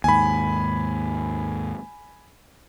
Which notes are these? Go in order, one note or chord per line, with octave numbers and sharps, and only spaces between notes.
D#2 G#2 G#5 B5